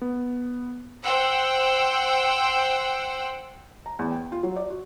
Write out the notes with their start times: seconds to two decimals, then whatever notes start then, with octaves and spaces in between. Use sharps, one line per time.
0.01 B3
1.03 C5 F#5 G5 E6
3.86 A#5
3.99 E2
4.11 G5
4.32 F4
4.43 F#3
4.57 D5
4.70 F#4